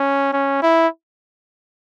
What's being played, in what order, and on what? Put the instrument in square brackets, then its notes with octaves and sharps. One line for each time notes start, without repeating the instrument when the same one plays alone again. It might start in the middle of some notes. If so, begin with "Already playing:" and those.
Already playing: [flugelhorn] C#4
C#4
E4